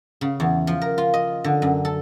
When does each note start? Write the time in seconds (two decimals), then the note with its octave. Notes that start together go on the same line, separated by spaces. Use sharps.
0.21 C#3
0.40 E2
0.67 F3
0.81 A#4
0.98 F4
1.14 D#5
1.44 D3
1.62 F#2
1.85 A4